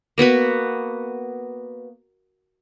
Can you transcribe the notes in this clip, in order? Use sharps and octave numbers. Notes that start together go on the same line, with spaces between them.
A#3 B3 F#4 B4